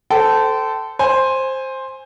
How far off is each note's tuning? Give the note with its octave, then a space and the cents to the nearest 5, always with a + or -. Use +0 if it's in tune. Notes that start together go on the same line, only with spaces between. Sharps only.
A4 +0 C5 -25 G5 -25
C5 +10 G#5 -5